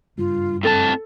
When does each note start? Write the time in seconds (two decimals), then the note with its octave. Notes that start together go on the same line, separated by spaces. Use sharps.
0.18 F#1 G2 F4
0.63 A2 C4 A4 A5 A6